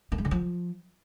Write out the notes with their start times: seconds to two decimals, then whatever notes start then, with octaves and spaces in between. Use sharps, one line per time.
0.12 A#3
0.18 G#3
0.25 D3
0.31 F3